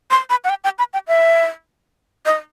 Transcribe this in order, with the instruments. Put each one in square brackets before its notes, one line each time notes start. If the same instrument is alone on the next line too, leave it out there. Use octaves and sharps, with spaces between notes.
[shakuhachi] C6
B5
F#5
G5
G5
B5
G5
E5
D#5